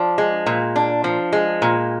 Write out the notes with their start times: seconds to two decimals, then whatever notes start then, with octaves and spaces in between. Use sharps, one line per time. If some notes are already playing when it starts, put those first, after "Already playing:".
Already playing: F3 D4
0.18 G#3
0.46 A#2
0.76 D4
1.04 F3
1.33 G#3
1.62 A#2